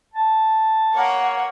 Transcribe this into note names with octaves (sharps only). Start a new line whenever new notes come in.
A5
A#3 C#5 F#5